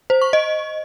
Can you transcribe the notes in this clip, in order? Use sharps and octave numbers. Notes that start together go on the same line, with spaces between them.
C5
C#6
D#5